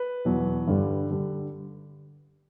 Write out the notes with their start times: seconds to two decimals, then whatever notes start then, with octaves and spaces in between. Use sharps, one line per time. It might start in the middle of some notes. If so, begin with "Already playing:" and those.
Already playing: B4
0.25 E2 B2 F#3
0.67 G2 D3 G3
1.11 D3 G3